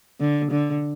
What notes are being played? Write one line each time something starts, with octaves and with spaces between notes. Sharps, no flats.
D3
D3